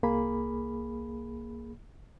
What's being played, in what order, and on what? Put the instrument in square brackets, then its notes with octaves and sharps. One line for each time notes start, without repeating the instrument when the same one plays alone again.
[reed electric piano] C2 A#3 G#4 B5